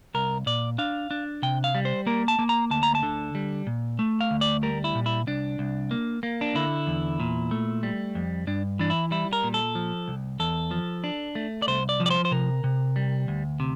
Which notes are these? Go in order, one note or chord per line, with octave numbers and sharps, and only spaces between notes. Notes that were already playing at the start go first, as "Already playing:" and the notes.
C2 A#4
A#2 D5
D4 F5
D4
C3 G5
F5
G3
C5
A#3 A#4
A5
A#3
A#5
D2 A5
A#5
A5
D3
G3
A#2
A3
F5
D2
D5
G3 A#4
E4
A#2
E4
C2 D4
C2
A#3
A#3
D4
D3 E4
E2
A#2
A3
G3
F2
G2 D4
E3 D4
E4
G3 E4
A#4
A#2
A4
F3
C2
E2 A4
F3
D4
A3
D5
C2 C5
D5
F3
D5
C5
C5
C3 A#4
C3
G3
D2
C3